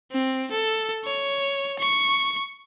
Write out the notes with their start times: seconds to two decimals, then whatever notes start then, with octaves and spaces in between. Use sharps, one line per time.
0.12 C4
0.51 A4
1.05 C#5
1.79 C#6